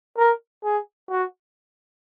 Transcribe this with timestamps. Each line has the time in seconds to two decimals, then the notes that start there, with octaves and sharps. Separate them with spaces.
0.18 A#4
0.64 G#4
1.10 F#4